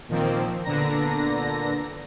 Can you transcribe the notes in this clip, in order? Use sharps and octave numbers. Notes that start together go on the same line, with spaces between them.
A#2 D#3 F3 A#3 C4
A#2 D3 B3 D4 A#5 A#6